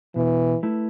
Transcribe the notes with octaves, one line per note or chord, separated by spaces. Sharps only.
B2 E3
A3 E4 B4